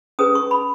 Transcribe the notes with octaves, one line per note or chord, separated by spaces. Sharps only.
C#4 G#4 B4 D#6
C#6
B5